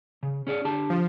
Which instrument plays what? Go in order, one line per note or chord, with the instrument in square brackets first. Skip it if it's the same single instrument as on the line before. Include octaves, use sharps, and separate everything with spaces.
[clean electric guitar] C#3
C#4 G#4 D5
D3 G4 A5
[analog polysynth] F3